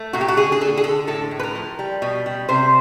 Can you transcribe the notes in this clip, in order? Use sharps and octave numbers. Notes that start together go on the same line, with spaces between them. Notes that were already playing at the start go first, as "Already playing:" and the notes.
Already playing: A3
A#2 F#4
G4
F#4
D3 G#4
G#4
D3 A4
G#4
D3 A4
A2 A4
A2
B4
A#4
F3
G3
B2
G3
C3 C5